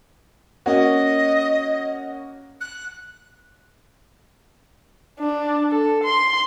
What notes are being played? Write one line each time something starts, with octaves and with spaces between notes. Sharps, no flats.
A#3 C#4 F#4 D#5
F#6
D4
A4
C6